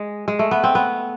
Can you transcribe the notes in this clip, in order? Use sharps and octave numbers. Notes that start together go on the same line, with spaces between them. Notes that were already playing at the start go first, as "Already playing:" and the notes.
Already playing: G#3
G#3
A3
B3
C4
B3